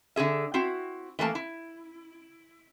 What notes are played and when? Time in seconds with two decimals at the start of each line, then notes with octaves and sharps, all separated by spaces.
0.16 D3 F#4 G#4 E5
0.54 C4 E4 F#4
1.19 E3 A3 A#3 A5
1.35 E4